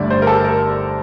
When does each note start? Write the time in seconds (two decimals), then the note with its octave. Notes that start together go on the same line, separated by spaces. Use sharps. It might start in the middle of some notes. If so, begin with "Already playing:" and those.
Already playing: G1 G2 D3 A3 D5 E5
0.10 C5
0.22 A#4
0.27 A4
0.44 A#4